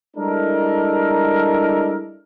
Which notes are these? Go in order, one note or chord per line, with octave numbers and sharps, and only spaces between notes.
G3 G#3 D4 E4 A4 A#4